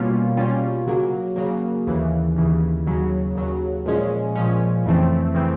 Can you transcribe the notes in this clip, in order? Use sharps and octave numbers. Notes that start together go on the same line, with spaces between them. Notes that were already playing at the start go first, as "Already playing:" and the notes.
Already playing: B2 G3 A#3 C#4 F4
B2 G3 A#3 C#4 F4
C#3 F#3 A#3
C#3 F#3 A#3
D#2 C#3 E3
D#2 C#3 E3
D#2 C#3 F#3
D#2 C#3 F#3
A#2 F3 G#3 C#4
A#2 F3 G#3 C#4
F2 C#3 E3 A3 C4
C#3 E3 A3 C4